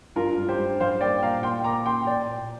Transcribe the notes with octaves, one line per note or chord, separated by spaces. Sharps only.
G2 F4 A#4
G2
G4 C5
G2
G3 C5 F5
A#3 D5 G5
A#2 F5 A#5
A#2 G5 C6
A#3 A#5 D6
A#3 G5 C6
A#3 D5 G5
A#2